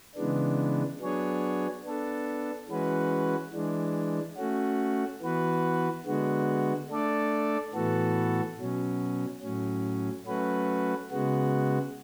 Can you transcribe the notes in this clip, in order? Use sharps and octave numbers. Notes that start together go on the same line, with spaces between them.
C#3 E3 G#3 B3 D4
F#3 B3 D4 G#4 C#5
B3 D4 A4
E3 G#3 C#4 F#4 B4
E3 G#3 D4
A3 C#4 F#4
E3 B3 F#4 B4
D3 G#3 B3 F#4
A3 D4 A4 D5
A2 E3 B3 F#4 A4
B2 F#3 C#4
A2 F#3 C#4
F#3 A3 C#4 F#4 B4
C#3 G#3 B3 F#4